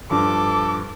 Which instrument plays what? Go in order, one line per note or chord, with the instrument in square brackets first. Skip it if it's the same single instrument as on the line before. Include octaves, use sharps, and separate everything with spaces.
[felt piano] G2 F3 [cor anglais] A4 [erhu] D6